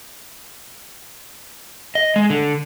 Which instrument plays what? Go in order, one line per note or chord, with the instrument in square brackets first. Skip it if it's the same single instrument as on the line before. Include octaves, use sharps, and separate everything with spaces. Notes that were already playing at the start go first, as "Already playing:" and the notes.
[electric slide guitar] D#5
G#3
D3